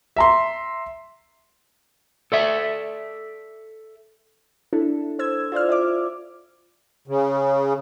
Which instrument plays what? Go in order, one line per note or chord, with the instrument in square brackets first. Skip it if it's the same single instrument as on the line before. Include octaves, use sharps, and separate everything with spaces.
[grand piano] E5 A#5 C6
[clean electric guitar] A4 D5 E5
[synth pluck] D4 E4 A4
C5 E6 G#6
F4 C5 D5 F6
D5 E5 D6
[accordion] C#3